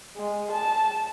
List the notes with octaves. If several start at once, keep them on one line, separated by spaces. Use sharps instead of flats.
G#3
A5